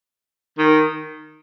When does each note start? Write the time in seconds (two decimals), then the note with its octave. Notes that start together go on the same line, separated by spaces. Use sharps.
0.58 D#3